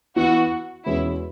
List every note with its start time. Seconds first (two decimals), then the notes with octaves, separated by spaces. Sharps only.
0.16 E3 B3 E4 F#4
0.86 E2 B2 G#3 C#4 E4